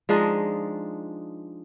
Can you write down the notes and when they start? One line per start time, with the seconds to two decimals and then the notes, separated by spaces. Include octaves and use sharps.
0.09 F3 G#3 D4 D#4